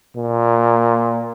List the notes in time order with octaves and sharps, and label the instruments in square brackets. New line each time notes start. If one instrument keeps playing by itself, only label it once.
[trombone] A#2